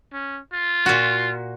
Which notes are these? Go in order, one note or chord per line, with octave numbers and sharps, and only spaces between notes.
C#4
F4
A#2 F#4